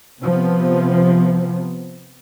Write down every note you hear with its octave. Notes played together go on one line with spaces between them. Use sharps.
C3 F3 B3